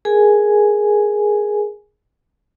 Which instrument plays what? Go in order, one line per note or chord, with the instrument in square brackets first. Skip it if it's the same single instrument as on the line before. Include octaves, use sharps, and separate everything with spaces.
[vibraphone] G#4 A#4 G#5